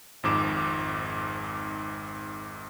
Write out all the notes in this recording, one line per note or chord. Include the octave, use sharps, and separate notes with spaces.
G#1 F2 G#2 D6 E7